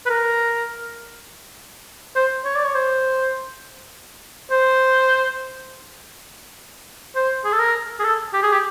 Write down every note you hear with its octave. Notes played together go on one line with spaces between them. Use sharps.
B4
A#4
C5
C#5
D5
C#5
C5
C5
C5
G#4
A4
A#4
G#4
A4
G4
G#4
G4